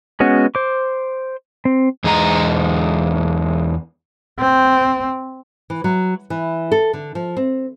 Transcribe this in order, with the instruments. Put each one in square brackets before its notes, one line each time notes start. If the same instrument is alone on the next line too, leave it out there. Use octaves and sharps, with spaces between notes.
[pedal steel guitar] G#3 B3 C#4 F#4
C5 D6
C4
[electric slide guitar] E2 G#3 D#4 E4 A#5
[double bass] C4
[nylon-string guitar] E3
F#3
E3
A4
D3
F3
C4